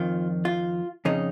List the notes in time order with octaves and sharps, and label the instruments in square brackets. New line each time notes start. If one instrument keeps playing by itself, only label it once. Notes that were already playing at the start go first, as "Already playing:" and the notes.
Already playing: [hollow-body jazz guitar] F2 D#3 F4
F4
F2 C#3 D#4